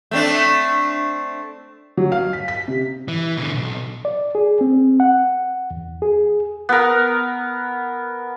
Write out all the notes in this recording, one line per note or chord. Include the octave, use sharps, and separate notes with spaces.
A3 C4 D4
F#3
F5
B6
B6
C3
E3
B2 D3
B1
D5
G#4
C4
F#5
E2
G#4
B3 A#4